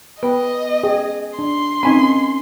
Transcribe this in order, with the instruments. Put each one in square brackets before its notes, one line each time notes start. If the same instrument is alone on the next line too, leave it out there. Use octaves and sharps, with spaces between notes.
[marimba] B3 G5 [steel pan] B4 [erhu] D#5
[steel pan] G#4 [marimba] G5
[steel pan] D4 [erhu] C6
[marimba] C4 C#4 [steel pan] D#4 G#5 B5